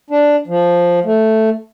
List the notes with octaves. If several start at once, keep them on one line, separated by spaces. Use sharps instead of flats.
D4
F3
A3